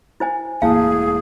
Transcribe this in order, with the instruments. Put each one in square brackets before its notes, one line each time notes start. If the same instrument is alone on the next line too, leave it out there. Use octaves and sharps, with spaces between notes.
[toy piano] E4 C5 G#5
[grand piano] E1 A2 [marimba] A#3 A5 [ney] G#4 [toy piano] F5